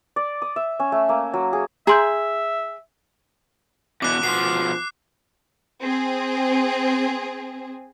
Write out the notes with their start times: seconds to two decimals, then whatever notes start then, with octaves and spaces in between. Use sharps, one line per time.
0.16 D5
0.42 D#6
0.56 E5
0.80 C#4
0.92 A3
1.09 A#3
1.34 F#3
1.53 G#4
1.87 G#4 E5 A#5 C6 G6
4.02 E2 B2 D6 F#6
4.23 B2 F3 C7
5.82 C4 G#4